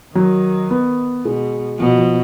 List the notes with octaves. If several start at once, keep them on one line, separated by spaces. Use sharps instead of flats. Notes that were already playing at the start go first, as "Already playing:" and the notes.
D#3 F#3
B3
B2 G#3
B2 F3
F3